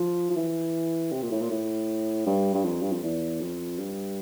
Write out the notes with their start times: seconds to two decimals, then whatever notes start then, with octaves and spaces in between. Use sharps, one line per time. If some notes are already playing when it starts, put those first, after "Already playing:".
Already playing: F3
0.30 F3
0.36 E3
1.13 C3
1.22 A#2
1.31 A2
1.41 A#2
1.51 A2
2.27 G2
2.54 G2
2.65 F2
2.82 G2
2.92 F2
3.03 E2
3.41 F2
3.79 G2